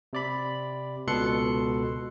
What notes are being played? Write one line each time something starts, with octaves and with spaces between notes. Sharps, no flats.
C3 D5 B5
C#2 B2 A4 C6 F#6 C#7